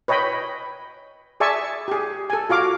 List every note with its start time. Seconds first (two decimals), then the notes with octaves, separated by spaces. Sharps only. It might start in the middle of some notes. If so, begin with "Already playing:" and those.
0.08 B4 C#5 D#5 G5 B5
1.40 G#4 D5 E5 G#5 A5 C#6
1.88 G4 G#4
2.30 A4 G#5
2.49 F4 F#4 F5 D6